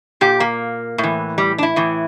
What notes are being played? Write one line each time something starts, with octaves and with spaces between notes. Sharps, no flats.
A#2 G4
A#3
A2
E3
G3
D4
E4
A2 E3